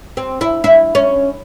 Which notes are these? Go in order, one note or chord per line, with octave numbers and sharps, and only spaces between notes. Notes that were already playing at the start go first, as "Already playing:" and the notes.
C4
E4
E4
C#4